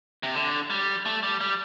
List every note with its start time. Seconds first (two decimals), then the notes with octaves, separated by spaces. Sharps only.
0.23 C3
0.35 D3
0.70 G3
1.06 A3
1.23 G3
1.41 G3